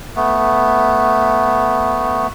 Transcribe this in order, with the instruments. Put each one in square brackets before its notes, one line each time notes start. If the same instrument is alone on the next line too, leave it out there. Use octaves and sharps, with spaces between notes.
[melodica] A3 B3